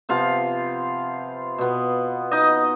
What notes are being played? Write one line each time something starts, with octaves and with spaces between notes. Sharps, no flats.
C3 F3 B3 F4 F5
B2 B3
D#4 D#5